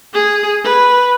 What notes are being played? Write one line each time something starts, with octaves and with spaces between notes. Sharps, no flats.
G#4
B4